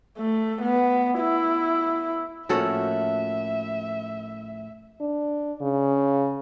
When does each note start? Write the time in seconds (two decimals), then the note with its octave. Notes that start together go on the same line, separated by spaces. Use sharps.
0.18 A3
0.62 B3
1.19 E4
2.49 A2 F3 A#3 C#4 F#4 A4 E5 F#5
5.01 D4
5.61 C#3